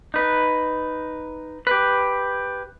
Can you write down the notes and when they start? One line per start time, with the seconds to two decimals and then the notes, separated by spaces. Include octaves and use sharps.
0.14 D#4 B4
1.67 G4 B4